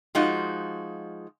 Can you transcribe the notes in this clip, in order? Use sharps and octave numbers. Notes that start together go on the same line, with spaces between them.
F3 G#3 D#4 F4 F#4